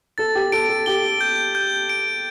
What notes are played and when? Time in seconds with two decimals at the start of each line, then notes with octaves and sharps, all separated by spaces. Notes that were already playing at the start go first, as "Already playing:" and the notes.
0.18 A4 A6
0.35 G4
0.52 A4 D7
0.69 A4
0.86 G4 G7
1.21 G6
1.55 G6
1.89 D7